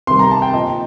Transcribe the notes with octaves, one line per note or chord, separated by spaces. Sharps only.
C3 D#3 G3 C6
A#5
A5
G5
A#2 F3 D#5